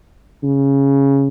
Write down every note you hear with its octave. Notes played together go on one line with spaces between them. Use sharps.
C#3